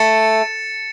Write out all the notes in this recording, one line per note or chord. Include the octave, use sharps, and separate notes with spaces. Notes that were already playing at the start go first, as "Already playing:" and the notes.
Already playing: A3 A6 C#7 E7